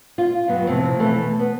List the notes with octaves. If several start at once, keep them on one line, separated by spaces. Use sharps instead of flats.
F4
G2 F#3 B3
F2 A2 C3
B2 E3 A3 A4
B3